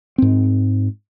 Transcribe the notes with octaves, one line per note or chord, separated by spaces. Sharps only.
G#2 C4